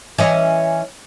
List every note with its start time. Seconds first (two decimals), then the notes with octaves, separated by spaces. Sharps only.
0.18 E3 C#4 D#5